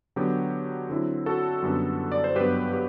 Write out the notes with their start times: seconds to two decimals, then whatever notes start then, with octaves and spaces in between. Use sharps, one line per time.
0.16 D3 F#3 B3 G4
0.89 D3 F#3 C4 E4
1.26 F#4 A4
1.62 F#2 D3 G3 B3
2.12 D5
2.24 C5
2.36 G2 F#3 B3 G4 B4
2.73 G4